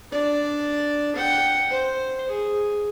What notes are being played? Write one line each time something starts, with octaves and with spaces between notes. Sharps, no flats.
D4 D5
F#5 G5
C5
G#4